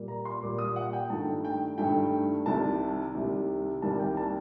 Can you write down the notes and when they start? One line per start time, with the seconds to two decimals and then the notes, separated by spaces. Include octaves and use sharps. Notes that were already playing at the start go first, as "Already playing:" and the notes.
Already playing: A#2 G3 A#3
0.08 A#5
0.25 C6
0.42 A#2 G3 A#3 D6
0.58 D#6
0.76 F#5
0.93 G5
1.10 G2 D#3 A3 A5
1.45 G5
1.78 G2 D#3 A3 G5
2.46 C2 C3 D#3 A5
3.15 C2 C3 D#3
3.82 C2 C3 D#3 G3 A#3 A5
3.99 G5
4.17 A5